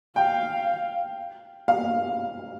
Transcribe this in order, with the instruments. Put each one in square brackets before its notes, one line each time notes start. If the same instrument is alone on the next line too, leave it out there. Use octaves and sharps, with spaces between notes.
[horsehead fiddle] F5 [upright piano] G5
[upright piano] F5